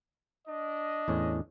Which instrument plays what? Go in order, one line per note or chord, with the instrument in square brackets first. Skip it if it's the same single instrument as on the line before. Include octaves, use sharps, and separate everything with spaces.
[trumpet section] D4 D#5
[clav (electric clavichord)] E2 A2 C#4